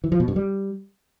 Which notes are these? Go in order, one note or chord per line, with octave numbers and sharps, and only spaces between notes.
E3
F3
B2
G2
G3